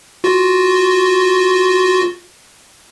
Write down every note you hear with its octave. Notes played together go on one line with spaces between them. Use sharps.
F4 F#4